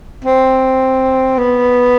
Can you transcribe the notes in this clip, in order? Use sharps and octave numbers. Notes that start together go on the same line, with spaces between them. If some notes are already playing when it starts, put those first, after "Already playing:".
C4
B3